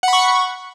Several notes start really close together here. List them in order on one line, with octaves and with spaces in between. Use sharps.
F#5 B5 C#6